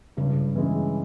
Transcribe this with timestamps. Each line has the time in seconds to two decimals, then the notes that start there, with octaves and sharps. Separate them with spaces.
0.17 G2 C#3
0.55 E3 G#3 C#4